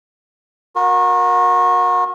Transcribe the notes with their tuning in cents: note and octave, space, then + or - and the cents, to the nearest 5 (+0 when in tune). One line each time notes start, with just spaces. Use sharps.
F#4 -35 A#4 +15